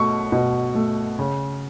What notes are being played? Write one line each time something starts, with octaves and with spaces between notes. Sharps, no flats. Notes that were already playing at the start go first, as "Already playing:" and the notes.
Already playing: B2 A3 C#6
B2
A3
C#3